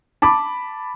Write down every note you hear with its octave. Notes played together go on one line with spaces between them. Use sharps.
A5 B5 D6